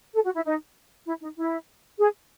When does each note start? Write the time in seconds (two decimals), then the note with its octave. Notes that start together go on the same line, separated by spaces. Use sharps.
0.15 A4
0.25 F#4
0.36 E4
0.45 D#4
1.07 E4
1.22 D#4
1.37 E4
1.98 G#4